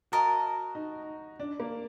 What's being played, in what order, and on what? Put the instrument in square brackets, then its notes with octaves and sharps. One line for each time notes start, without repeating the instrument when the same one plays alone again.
[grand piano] F#4 [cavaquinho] A#4 D#5 A5
[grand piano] D#4
D4
A#3